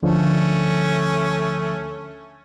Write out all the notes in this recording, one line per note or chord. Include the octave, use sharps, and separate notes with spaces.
D2 D3 F3 A3 C#4